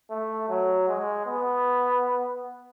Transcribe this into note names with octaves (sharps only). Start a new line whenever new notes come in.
A3
F#3
G#3
B3